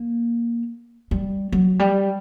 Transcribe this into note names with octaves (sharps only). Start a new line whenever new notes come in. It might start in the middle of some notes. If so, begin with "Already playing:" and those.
Already playing: A#3
G3
F#3
G3